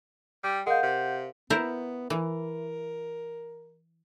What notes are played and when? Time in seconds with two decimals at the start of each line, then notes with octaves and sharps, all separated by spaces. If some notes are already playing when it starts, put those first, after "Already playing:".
0.44 G3 G5
0.67 G#3 A#4 F5 F#5 G6
0.83 C3
1.50 B3 E4 A#4 C5
2.10 E3 A#4